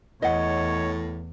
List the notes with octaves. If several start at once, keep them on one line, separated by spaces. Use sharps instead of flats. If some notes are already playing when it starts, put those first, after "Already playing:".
E2 A2 C#5 D#5 F#5